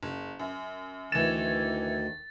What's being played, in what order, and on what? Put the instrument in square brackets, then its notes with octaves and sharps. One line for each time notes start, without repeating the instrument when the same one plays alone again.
[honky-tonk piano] F#1
F#2
[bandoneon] D2 D#3 [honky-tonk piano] E3 E7 [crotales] A6